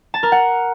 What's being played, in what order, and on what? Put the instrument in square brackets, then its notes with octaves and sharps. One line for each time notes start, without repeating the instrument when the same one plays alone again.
[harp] A5
A#4
F#5